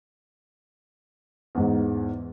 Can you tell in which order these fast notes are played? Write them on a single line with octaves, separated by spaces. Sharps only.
E2 G#2 G#3